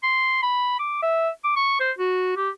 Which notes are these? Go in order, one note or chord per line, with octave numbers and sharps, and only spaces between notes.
C6
B5
D6
E5
D6
C#6
C5
F#4
G4